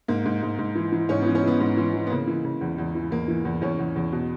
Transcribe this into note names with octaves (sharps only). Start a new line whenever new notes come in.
G#2 A#3
G#2
G#2
G#2
E3
E3
G#2 C#4
B3
E3
C#4
E3 B3
G#2 B3
E3
E3
B3
C#3 A#3
E3
C#3
E2
E2
E3
E2 A#3
E3
E2
E2 C#4
E2
E2
B2